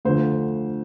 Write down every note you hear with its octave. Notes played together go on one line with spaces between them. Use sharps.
D2 D3 F3 C5